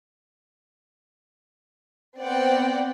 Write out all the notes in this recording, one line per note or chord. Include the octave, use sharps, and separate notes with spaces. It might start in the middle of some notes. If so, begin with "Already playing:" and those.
B3 C4 D5 F#5 G5